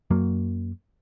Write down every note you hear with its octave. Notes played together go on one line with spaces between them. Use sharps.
F#2 F#3 A#3